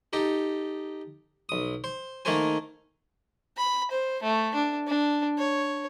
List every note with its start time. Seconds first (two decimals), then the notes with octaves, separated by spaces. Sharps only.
0.13 D#4 G4 A4
1.49 B1 D#6
1.84 C5
2.25 D#3 A3 A#3 A4 C5 G#5
3.57 B5
3.91 C5
4.23 A3
4.55 D4
4.87 D4
5.38 C#5